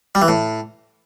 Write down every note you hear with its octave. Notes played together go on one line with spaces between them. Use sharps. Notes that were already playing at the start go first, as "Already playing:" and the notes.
G3
E3
A2